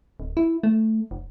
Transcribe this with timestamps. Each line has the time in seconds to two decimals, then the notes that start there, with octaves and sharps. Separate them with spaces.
0.20 D1
0.37 E4
0.63 A3
1.11 F1